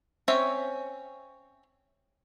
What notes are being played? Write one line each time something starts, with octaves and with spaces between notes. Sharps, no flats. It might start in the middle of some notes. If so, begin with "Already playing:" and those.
C4 C#4 C#5 E5